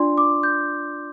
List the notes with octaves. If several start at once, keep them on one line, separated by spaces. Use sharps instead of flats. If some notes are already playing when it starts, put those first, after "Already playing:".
Already playing: D4 F4 D5 C6
D6
G6